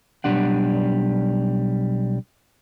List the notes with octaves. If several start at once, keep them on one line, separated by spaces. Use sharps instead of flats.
B1 G3 D4 F#5